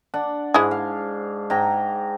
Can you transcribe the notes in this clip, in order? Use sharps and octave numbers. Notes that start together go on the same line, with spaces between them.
D4 F#5
G#2 G#3 E4 G#4
F5
G#2 G5 A#5